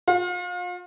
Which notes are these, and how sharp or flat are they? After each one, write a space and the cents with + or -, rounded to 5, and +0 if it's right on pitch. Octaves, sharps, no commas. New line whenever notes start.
F4 +35